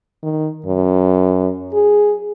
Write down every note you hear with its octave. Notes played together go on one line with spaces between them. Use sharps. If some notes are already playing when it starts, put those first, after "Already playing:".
D#3
F#2
G#4